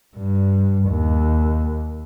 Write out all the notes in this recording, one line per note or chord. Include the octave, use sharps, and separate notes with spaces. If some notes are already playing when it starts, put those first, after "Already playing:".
G2
D#2